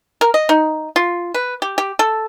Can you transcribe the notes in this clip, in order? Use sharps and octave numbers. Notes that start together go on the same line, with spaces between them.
A#4
D#5
D#4
F4
B4
G4
G4
A4